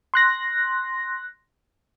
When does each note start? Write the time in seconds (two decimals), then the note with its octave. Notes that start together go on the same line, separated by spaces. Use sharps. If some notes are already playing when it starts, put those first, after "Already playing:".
0.14 C6 F#6 A#6